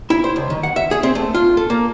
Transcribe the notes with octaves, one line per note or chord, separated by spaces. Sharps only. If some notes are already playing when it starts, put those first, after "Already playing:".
E4
C5
C#2
D#3
F#5
E5
G#4
C4
A3
F4
A4
A#3